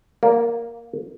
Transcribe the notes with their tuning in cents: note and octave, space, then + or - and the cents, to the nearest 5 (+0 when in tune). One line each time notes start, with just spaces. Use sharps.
A#3 +0 D5 -25